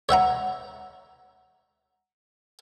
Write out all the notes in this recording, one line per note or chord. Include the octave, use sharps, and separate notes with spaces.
C#5 E5 F#5 A#5